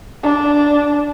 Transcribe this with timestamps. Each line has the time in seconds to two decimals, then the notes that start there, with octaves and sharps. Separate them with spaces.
0.23 D4